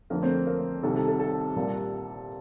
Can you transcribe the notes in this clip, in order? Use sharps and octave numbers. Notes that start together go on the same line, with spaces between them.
F2 D3 A3 A#3 A#4
C4 C5
A#3 A#4
C2 C3 D#3 A4
A4
A4
A4
C2 A#2 G3 A#3